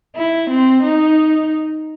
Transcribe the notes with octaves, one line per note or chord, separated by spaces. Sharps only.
E4
C4
D#4